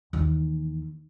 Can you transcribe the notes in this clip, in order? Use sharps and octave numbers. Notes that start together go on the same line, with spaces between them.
D#2 E3